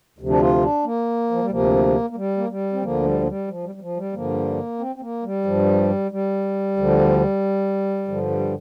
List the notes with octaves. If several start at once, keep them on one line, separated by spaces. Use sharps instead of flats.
D2 C3 F3
D4
F4
D4
A#3
F3
G3
D2 C3 F3 A#3
A#3
G3
A#3
G3
C4
D2 D3 F3 A#3
G3
A#3
G3
F3
G3
G3
F3
G3
G2 D3 F3 A#3
C4
C4
A#3
G3
G2 F3
G3
D2 D3 F3
G2 D3 F3
G3